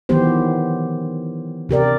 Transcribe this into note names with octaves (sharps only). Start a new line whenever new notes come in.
D#3 E3 F#3 B3 G4 C5
C3 G4 A#4 D5